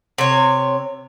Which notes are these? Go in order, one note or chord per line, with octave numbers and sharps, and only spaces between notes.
C3 C#5